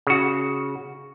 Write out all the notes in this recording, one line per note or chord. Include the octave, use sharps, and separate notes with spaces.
C#3 F#4